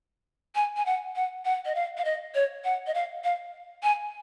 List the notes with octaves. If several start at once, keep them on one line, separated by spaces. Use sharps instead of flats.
G#5
G#5
F#5
F#5
F#5
D#5
F5
F5
D#5
C#5
F#5
D#5
F5
F5
G#5